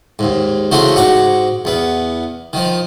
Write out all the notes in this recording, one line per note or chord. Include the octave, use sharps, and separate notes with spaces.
D#2 G#2
C#3 E3 A3 F#4 C5
G#2 F#4 C#6 D6
E2 B3
D#3 F3